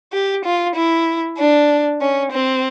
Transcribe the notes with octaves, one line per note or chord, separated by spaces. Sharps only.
G4
F4
E4
D4
C#4
C4